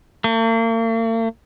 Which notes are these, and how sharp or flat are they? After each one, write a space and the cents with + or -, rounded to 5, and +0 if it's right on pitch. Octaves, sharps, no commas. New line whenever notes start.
A#3 -45